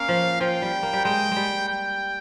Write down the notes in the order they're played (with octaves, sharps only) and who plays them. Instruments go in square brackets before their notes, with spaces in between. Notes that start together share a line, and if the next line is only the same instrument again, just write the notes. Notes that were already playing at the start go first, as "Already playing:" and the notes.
Already playing: [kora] A#3 C#4 [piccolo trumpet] F5
[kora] F3
[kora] F3 [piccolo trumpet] G5
[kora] G3
A#3
G3
[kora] G#3 [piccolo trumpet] G5
[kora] G3 G#3
[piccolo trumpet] G5